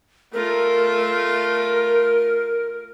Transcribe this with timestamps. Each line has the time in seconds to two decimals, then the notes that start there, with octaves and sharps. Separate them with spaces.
0.34 A3 F4 A#4